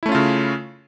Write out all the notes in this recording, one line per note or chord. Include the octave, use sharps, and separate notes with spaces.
C#3 A3 C#4 E4 F4